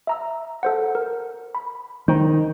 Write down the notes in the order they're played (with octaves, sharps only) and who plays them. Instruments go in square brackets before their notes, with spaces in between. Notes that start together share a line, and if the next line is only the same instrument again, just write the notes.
[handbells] E5 A#5 E6
A4 C5 F#5
A#4
B5
[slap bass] D#3 [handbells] C5